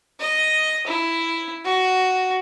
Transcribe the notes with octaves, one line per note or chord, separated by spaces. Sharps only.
D#5
E4
F#4